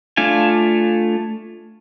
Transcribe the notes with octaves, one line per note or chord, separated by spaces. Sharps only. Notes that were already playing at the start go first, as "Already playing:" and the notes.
A3 D4 F4 G#5